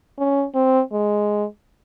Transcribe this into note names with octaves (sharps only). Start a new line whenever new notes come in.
C#4
C4
G#3